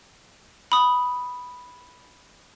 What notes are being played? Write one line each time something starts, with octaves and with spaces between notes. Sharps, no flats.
B5 D#6